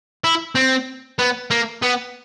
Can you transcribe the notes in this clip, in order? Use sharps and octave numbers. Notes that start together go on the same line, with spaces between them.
E4
C4
B3
A#3
B3